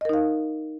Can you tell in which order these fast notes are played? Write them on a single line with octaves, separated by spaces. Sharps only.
D#5 A#4 D#4 F5